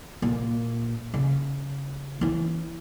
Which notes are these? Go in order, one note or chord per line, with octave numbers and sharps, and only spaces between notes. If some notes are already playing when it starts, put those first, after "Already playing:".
A#2
C#3
E3 C#4